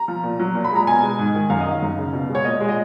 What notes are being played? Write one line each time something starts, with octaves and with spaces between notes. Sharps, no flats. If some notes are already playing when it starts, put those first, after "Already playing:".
Already playing: A#5
F3
A#2
F#3
A#2
B5
G#3 A#5
B2 G#5
G#3
G#2
D#3
F#2 F5
D#5
D#3
F5
F#2
C#3
B2
G#3
C#5
A#2 D#5
G#3
D#5